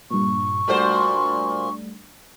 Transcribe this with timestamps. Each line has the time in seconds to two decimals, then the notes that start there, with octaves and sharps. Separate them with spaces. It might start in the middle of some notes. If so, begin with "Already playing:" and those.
0.11 G2 A#2 C#6
0.68 A#2 G3 A3 D4 F#4 C5